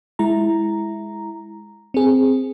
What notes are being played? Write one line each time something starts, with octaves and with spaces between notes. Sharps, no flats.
G#3 E4 A#5
C4 G#4